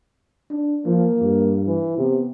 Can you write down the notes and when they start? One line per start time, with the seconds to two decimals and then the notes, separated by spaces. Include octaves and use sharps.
0.50 D4
0.86 F3 A#3
1.22 G2
1.67 E3
1.98 C3 B3